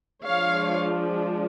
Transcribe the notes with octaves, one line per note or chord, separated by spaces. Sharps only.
F3 G#3 D4 C#5 F5